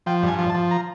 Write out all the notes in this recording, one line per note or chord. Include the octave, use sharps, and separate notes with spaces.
F3 G5
G2
G#5
F3
A5
F3
A#5